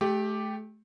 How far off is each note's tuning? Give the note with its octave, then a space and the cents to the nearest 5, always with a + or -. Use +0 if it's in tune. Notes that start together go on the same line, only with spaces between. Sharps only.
A3 -35 G4 +0